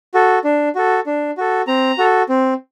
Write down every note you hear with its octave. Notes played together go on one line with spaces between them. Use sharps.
F#4 A4
D4
F#4 A4
D4
F#4 A4
C4 A#5
F#4 A4
C4